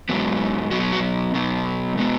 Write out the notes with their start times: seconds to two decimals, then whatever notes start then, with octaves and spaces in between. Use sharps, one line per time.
0.09 G#2 F#3 B3
0.71 B2 F#3 B3 F#4
0.92 F#4
1.34 B2 F#3 B3
1.96 B2 G#3 B3